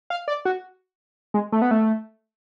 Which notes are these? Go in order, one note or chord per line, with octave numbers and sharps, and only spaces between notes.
F5
D5
F#4
G#3
A3
B3
A3